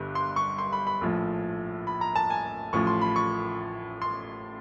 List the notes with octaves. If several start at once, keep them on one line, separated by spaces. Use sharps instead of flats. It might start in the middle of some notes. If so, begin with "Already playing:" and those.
Already playing: G1 G2 D3
C6
C#6
C6
B5
B5
A#1 A2 F3
B5
A#5
A5
G#5
A1 A2 F3 C#6
C6
B5
C#6
C6